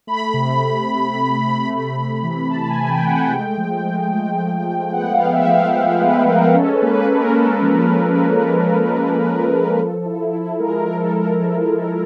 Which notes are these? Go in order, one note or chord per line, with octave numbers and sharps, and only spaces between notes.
A3 B5
C3
A3
C3
C3
A3
A3 B5
A3
E3
A3 A5
G#5
C3
G5
A3 F#5
G5
G#3
F3
G#3
G#3
F3
F3
B3 F#5
F5
B3
E5
F3
F5
G#3 E5
G#3 B4
G#3 A#4
C#4 A4
B4
A#3
B4
A#3
A#4
C#4 A4
F3
A#3
A#3
C#4
C#4
A#3 A4
F3
F3
F3
E4
E4
G#3 A#4
A#4
F3
A4
G#3
A#4
F3
G#3